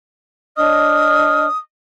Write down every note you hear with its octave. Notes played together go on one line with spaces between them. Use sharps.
D4 C#5 D#5 D#6 F6